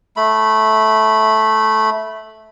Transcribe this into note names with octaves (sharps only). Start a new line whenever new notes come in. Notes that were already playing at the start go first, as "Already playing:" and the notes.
A3 B5